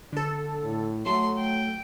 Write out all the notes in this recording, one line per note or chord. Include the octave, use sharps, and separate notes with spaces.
D3 A4
A2
F#3 A3 C6
G5